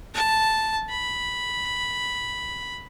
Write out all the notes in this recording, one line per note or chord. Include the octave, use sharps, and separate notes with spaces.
A5
B5